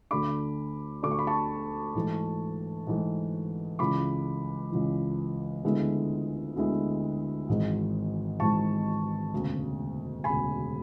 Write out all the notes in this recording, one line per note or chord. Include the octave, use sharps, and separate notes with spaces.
D2 D3 A3 D4 B5 D6
D2 D3 A3 D4 D6
C#6
B5
A5 C#6
G#2 E3 A3
G#2 E3 A3
C#2 C#3 E3 B5 D6
C#2 C#3 E3
D2 D3 G#3 B3 E4
D2 D3 G#3 B3 E4
G#1 G#2 E3 G#3
G#1 G#2 E3 G#3 A5 C#6
E1 D2 C#3
E1 D2 C#3 G#5 B5